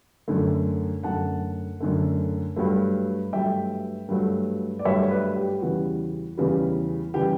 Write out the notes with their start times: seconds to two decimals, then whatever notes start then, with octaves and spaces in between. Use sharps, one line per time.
0.28 F#2 D3 A3
1.03 F#2 D3 A3 F#5 A5
1.80 F#2 D3 A3
2.56 G2 F#3 A3
3.33 G2 F#3 A3 E5 G5
4.09 G2 F#3 A3
4.79 D5
4.85 G2 F#3 A3 C#5 E5
5.11 B4 D5
5.36 G4
5.61 E2 C#3 E3 G3 F#4
6.38 E2 C#3 E3 G3
7.14 C#3 E3 G3 G4